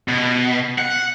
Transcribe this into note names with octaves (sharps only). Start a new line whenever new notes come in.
B2
F#5